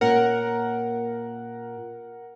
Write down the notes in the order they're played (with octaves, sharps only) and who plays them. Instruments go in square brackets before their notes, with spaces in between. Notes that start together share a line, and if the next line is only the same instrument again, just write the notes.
[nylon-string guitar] A#2 A#3 C#4 [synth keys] A#4 F#5